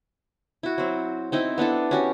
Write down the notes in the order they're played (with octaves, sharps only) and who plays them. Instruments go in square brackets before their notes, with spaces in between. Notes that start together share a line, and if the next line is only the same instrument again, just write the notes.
[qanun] E4 F#4
F#3 C4
C4 D#4 E4
B3 D4 E4 A4
C#4 F#4 G4